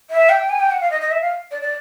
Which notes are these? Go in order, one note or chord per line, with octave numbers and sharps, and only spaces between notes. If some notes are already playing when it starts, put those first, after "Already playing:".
E5
G5
G#5
G5
F#5
F5
D#5
D#5
E5
F5
D5
D5